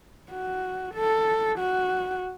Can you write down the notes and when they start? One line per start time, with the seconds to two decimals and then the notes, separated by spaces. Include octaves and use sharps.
0.31 F#4
0.95 A4
1.59 F#4